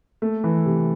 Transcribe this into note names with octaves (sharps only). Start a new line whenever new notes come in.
A3
E3
C3